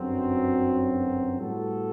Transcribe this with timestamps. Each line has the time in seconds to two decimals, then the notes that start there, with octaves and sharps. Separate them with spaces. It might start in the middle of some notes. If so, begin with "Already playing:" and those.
Already playing: G1 F#2 D3 F#3 C4
1.38 A2 G3 B3 F#4 A4